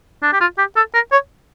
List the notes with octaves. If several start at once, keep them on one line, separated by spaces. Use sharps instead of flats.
D4
G4
F4
G4
A4
A#4
C#5